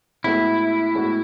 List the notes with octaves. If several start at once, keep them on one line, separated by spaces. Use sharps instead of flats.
A2 G#3 B3 E4 F#4 A4
A2 G#3 B3 F#4 A4